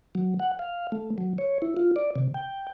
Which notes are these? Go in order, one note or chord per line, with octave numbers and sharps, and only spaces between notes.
F#3
F#5
F5
A3
F#3
C#5
E4
F4
D5
C3
G5